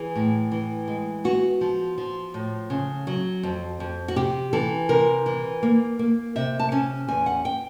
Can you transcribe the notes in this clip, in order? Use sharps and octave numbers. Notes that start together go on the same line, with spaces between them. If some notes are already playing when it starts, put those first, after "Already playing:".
Already playing: E3 G#4
A2
E3
G#3
B3 F#4
F3
F3
A2
C#3
F#3
F2
F2
F#4
C3 G4
E3 A4
C3 A#4
E3
A#3
A#3
C3 E5
A5
C#4 G#5
E2 G#5
F#5
G5